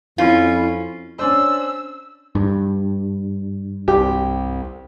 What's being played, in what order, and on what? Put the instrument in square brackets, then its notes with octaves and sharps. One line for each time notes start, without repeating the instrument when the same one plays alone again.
[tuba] F2 [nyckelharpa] C#4 [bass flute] E4 [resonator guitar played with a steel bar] F4
[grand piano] C#4 D4 C5 [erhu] E6
[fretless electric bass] G2
[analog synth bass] C2 [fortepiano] G4